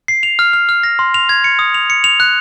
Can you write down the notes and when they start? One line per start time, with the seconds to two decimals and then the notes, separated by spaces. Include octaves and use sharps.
0.08 C7
0.23 F7
0.39 F6
0.53 F6
0.69 F6
0.83 A#6
0.99 C6
1.14 F7
1.29 G#6
1.44 C#7
1.59 D#6
1.74 F7
1.90 C#7
2.04 F7
2.20 F#6